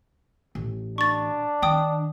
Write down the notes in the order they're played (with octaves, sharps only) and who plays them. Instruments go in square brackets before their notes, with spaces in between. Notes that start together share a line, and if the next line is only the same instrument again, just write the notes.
[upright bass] A1
[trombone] D4 [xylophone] C#6 A6
[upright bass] D#3 [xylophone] G5 D#6